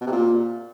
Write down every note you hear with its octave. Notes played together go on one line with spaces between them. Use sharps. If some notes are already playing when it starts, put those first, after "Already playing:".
B2
C3
A#2